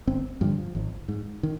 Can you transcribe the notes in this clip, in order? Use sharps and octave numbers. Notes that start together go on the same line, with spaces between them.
G1 C4
G2 D3 F3
G#1
G#2
D#3